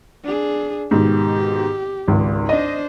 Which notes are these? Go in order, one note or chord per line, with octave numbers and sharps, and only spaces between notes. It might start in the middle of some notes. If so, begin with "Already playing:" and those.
D4 G#4
G#2 B2 D#3 G4
G#1 C#2
D4 C5 D#5